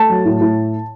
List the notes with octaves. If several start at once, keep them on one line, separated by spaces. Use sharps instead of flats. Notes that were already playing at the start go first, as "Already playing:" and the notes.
Already playing: A3 A5
F#3
A2
A2